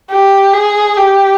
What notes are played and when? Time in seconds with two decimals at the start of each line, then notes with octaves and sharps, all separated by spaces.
0.11 G4
0.53 G#4
0.97 G4